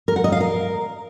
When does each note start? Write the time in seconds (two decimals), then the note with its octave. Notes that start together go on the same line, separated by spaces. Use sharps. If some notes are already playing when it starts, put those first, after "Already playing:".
0.08 A#4
0.16 F#5
0.24 D#5
0.32 F5
0.41 A#4